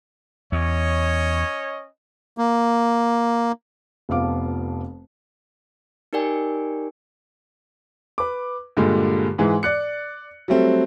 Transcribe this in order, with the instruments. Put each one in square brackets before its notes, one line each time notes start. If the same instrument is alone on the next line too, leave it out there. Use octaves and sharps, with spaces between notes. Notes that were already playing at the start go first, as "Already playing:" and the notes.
[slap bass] E2 [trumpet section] C#4 C#5 D#5
[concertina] A#3
[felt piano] F1 F2 B3 F5 D6
[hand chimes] D#4 G4 A#4 D5 G5 G#5
[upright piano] B4 D6
G2 A#2 D3 G3 G#3
G#2 E3 G#3
D5 F#6 C#7
F#3 G3 A3 C4